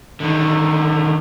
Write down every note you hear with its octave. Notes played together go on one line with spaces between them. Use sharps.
D3 D#3